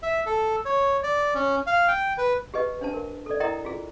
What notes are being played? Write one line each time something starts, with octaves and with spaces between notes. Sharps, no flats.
E5
A4
C#5
D5
C#4
F5
G5
B4
G4 G#4 B4 D#5
D4 C5 A5
A#4
A4 D5
E4 A#4 D#5 G5 A#5 D#6
F4 G#4